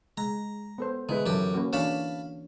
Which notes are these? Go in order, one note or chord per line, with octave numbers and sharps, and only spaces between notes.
G#3 A#5
B3 A4 C5
D3 G#3 E4 B4
F#2 E3 E4 G4 A4
A#3 C#4 F#4
E3 D4 C#5 F5 A5 B5